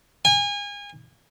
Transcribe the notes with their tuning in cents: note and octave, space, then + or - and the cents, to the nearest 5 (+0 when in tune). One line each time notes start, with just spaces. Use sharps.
G#5 -30